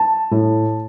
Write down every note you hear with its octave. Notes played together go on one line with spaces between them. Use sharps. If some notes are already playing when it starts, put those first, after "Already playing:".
Already playing: A5
A2